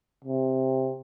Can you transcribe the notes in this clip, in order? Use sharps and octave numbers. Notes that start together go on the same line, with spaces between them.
C3